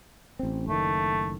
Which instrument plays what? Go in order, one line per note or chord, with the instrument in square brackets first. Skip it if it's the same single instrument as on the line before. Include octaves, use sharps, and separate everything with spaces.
[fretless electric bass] A1 C4
[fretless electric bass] F#1 A2 D#3 [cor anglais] A3